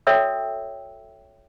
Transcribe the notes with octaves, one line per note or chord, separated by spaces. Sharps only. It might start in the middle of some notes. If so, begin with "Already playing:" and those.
F#4 A4 C#5 E5 G5 E6